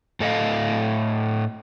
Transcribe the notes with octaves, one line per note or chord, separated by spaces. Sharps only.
A2 A4 D#5 F5